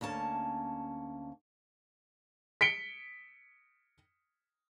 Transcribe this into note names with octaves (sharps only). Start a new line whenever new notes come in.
D2 A#3 C#4 A5
B6 C#7 D7 G7